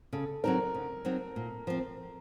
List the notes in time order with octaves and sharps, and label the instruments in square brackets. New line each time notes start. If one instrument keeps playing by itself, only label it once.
[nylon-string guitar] C#3 [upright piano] A4
[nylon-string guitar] F#3 C4 D#4 [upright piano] A#4
[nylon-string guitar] C#3
F#3 C4 D#4
A#2
F3 C4